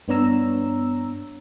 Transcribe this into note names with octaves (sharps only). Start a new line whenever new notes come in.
G2 B3 D4 C#5 A#5 E6